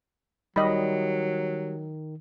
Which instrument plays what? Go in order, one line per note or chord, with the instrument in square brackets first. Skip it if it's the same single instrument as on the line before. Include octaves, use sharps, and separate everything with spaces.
[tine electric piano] D#3 [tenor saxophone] F#3 [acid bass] G3 [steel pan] D#5 B5